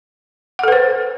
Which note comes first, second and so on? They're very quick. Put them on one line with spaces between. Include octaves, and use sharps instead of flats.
F#5 A4 B4 C5